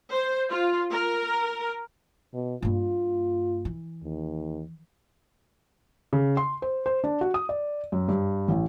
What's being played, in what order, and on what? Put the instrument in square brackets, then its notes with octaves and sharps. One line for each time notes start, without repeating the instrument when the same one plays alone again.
[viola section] C5
F4
A#4
[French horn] B2
[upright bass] G2 A#3 [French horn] F4
[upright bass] E3
[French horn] D#2
[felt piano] C#3
C6
C5
C5
D4
F#4
D#6
D5
F#2
G2
A1